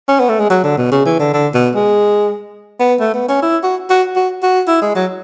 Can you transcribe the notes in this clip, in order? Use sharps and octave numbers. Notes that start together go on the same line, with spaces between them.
C#4
B3
A3
G#3
F#3
D3
B2
C#3
E3
D3
D3
B2
G#3
B3
A3
B3
C#4
E4
F#4
F#4
F#4
F#4
E4
G#3
F#3